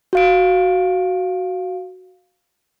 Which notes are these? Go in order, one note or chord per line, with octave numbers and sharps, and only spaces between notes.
F#4 F5 D7